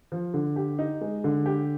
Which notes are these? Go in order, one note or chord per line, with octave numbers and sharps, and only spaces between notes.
F3
D3
G4
D#4
G#3
D3
G4